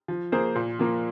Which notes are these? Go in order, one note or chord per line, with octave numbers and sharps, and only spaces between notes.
F3
A#3 G#4 C5
A#2
F3 A#3